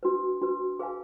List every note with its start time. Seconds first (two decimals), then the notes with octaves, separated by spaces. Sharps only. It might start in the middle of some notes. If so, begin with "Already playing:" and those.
0.03 D4 F#4 B4
0.42 D4 F#4 B4
0.79 G#4 B4 F5 G#5